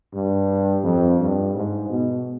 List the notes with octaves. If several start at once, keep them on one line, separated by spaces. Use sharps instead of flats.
G2
F2
G2
G#2
B2